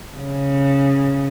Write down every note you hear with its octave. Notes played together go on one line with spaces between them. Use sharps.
C#3